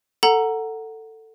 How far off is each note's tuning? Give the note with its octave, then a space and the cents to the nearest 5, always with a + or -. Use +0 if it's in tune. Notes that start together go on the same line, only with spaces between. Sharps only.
A4 +15 F#5 +0 A#5 +0